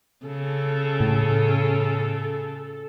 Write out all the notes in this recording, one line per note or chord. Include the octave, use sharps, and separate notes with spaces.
C#3 A4
A2